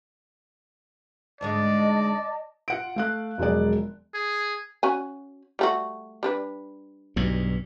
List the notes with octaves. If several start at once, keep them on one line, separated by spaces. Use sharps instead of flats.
D2 G#2 G#3 D5 D#5 A5
F4 F#5 D7
A3 F5 F#6
E1 F3 F#3 G#3 D5
G#4
C#4 F#4 G#5
G3 A3 F#4
G3 D4 B4
B1 G2